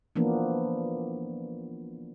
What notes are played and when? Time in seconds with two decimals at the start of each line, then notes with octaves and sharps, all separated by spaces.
0.16 E3 F3 A#3 B3 D4